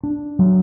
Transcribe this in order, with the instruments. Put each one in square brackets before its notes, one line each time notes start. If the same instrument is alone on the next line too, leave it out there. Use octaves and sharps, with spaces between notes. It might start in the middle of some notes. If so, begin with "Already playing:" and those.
[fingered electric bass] D4
F#3